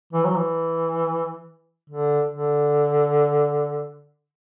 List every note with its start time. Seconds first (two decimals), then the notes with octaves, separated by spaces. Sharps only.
0.13 E3
0.25 F#3
0.36 E3
1.90 D3
2.34 D3